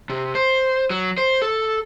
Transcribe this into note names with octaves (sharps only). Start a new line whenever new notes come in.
C3
C5
F#3
C5
A4